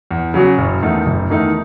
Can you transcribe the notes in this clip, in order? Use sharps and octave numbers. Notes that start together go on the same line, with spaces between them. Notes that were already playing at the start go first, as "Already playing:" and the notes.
E2
C#3 F#3 C#4 F#4
F#1
E2 D#3 A3 D#4
F#1
E2 D#3 A3 D#4